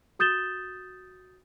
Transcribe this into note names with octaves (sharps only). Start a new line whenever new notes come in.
F#4 D#6 G6 A6 E7 G7